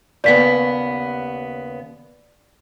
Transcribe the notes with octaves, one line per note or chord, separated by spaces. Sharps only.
D#2 C#3 B3 D5 B6